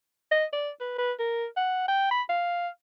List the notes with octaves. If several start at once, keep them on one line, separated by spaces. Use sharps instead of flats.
D#5
D5
B4
B4
A#4
F#5
G5
B5
F5